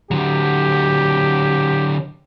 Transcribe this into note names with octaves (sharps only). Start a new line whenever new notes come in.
D3 F#3 G4